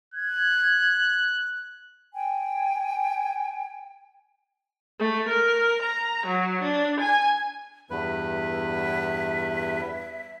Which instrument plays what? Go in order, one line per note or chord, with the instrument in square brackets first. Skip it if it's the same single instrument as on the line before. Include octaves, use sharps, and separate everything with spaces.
[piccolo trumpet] F#6 [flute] G#6
[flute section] G5 G#5
[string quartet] A3
A#4
A#5
F#3
D4
G#5
[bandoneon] E2 G2 B4 [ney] E5